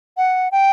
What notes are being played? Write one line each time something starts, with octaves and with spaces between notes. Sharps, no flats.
F#5
G5